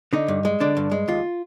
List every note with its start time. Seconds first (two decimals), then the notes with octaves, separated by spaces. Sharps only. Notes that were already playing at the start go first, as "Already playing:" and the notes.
0.13 D3 D#4
0.28 G2
0.45 G#3
0.60 D3 D4
0.77 G2
0.92 G#3
1.08 D#2 F4